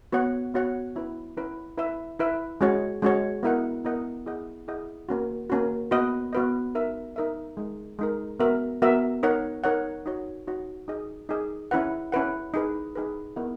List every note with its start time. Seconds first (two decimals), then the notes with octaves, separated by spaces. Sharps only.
0.12 B3 F#4 C#5 F#5
0.54 B3 F#4 C#5 F#5
0.95 C#4 E4 B4
1.37 C#4 E4 B4
1.78 E4 B4 E5
2.19 E4 B4 E5
2.61 G#3 C#4 F#4 C#5
3.02 G#3 C#4 F#4 C#5
3.43 B3 E4 A#4 D#5 F#5
3.85 B3 E4 A#4 D#5 F#5
4.26 E4 G#4 D#5 F#5
4.68 E4 G#4 D#5 F#5
5.09 A#3 C#4 F#4
5.50 A#3 C#4 F#4
5.91 B3 F#4 B4 D#5
6.33 B3 F#4 B4 D#5
6.75 D#4 A#4 E5
7.16 D#4 A#4 E5
7.57 G#3 D#4 A#4
7.99 G#3 D#4 A#4
8.40 B3 F#4 A#4 E5
8.82 B3 F#4 A#4 E5
9.23 D#4 A#4 C#5 F#5
9.64 D#4 A#4 C#5 F#5
10.06 D#4 F#4 C#5
10.47 D#4 F#4 C#5
10.88 D#4 G#4 D#5
11.29 D#4 G#4 D#5
11.71 C#4 E4 B4 F#5
12.12 C#4 E4 B4 F#5
12.54 D#4 G#4 B4
12.95 D#4 G#4 B4
13.36 B3 E4 A#4 D#5 F#5